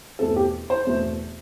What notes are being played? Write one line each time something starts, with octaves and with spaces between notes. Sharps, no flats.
E2 B2 A3 C4 A4
G4
C5
E2 B2 A3 C4